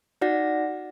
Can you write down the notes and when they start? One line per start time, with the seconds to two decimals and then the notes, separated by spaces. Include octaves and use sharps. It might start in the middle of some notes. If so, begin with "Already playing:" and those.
0.21 D#4 F#4 D5 F#5 A#6